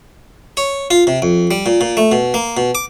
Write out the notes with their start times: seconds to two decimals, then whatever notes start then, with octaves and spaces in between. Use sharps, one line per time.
0.57 C#5
0.91 F4
1.07 C3
1.22 F2
1.51 G3
1.66 A#2
1.81 A#2
1.97 A3
2.12 B2
2.34 A#3
2.57 B2
2.75 D6